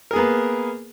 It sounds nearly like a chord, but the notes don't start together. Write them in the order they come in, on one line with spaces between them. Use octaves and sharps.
A#4 G#4 B3 A#3